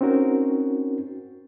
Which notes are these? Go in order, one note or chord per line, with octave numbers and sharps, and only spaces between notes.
C4 C#4 D#4 F#4 A#4